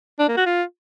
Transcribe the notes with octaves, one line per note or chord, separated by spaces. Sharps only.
D4
A#3
F#4
F4